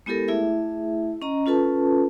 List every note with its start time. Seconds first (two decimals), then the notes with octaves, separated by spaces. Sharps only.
0.06 G#3 B3 E4 G4 A4 A#4
0.28 A3 E4 G#4 E5
1.22 C#4 D#5 A#5
1.46 C#4 F4 A4 B4 A5